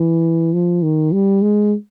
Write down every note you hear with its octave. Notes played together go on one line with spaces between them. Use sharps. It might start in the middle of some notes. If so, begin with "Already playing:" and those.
Already playing: E3
F3
D#3
G3
G#3